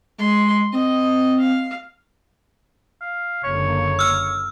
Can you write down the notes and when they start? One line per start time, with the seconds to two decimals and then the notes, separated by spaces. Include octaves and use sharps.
0.18 G#3 C6
0.73 C4 D#5
1.40 F5
3.02 F5
3.44 F#1 D3 A#3 C#5
3.99 E6 F6